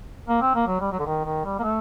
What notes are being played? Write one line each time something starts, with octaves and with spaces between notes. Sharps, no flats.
A#3
C4
A#3
F#3
G3
F#3
D3
D#3
D#3
G3
A#3
A3